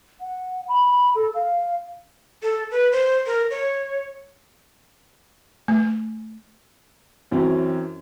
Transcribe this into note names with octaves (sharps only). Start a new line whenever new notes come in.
F#5
B5
A4
F5
A4
B4
C5
A#4
C#5
A3
F#2 E3 C4 C#4